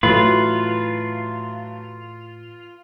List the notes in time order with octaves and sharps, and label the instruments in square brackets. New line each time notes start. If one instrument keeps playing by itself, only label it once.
[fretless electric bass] A2 E3 [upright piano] F#3 A3 [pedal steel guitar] F4 [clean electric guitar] B4